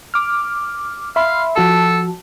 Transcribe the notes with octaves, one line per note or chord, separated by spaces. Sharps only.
D6 F6
E5 F5 B5 C6
F3 F#4 A4 A5